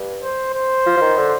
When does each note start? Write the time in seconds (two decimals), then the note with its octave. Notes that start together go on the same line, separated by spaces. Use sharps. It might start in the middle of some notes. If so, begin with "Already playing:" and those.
Already playing: G2
0.22 C5
0.53 C5
0.86 F3
0.97 F3
1.01 D#3
1.17 D3